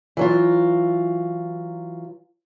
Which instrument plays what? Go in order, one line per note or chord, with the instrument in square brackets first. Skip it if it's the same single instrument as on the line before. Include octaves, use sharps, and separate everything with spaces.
[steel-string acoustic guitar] E3 F#3 F4